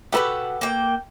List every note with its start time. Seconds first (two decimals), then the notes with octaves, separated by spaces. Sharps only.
0.12 B2 A#3 G4 A4 B4 F#5
0.61 A#3 G5